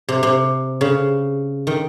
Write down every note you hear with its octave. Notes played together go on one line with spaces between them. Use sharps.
C3
C3
C#3
D#3